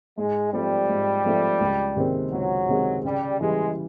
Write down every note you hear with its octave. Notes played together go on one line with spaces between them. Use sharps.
G#2 G#3
F3 G3 A3 C4
G#2
F3 A3 C4
C#2
C3 D#3 G#3 C4
C#2 F#3
C3 D#3 G#3 C4
C#3 G3
E3 G3 G#3